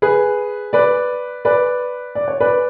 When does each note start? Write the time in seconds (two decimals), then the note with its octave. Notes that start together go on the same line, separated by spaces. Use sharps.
0.02 G#4 B4
0.73 B4 D5
1.45 B4 D5
2.15 D5
2.28 C#5
2.40 B4 D5